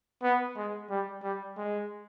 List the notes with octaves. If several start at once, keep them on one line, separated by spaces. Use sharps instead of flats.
B3
G#3
G3
G3
G#3